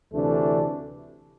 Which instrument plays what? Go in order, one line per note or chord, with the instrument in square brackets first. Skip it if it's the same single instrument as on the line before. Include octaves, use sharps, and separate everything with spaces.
[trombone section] D2 C3 E3 A3 D4